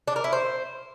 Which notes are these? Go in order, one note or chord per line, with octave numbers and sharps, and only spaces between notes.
D4
A#4
E4
C5